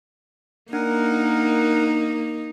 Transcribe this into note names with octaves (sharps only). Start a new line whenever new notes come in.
A#3 D4 D#4 A#4 F#5